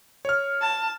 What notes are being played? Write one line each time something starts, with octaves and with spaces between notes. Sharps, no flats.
C#5 F6
A5